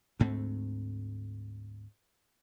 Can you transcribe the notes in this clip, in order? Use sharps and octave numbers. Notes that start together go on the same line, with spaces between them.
D2 G#2 A3 C4